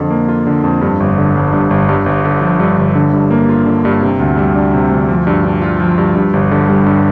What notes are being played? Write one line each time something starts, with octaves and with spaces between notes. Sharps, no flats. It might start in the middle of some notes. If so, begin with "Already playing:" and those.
Already playing: F2 D3
A#3
F4
D3
F2
G2
G1
D3
G1
G2
G1
G2
G1
D3
F3
G2
G1
D3
G2
A#3
F4
D3
G2
C3
D2
G3
D4
C3
D2
F3
G2
D4
F4
F3
G2
G2
G1
D3
G3
G2